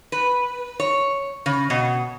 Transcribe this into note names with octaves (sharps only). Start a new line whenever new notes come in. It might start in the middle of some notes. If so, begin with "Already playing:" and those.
B4
C#5
C#3
B2